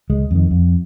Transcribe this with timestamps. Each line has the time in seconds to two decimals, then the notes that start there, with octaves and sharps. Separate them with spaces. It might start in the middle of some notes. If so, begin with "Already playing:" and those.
0.10 C#2 G#3
0.31 F2 D#3
0.51 F2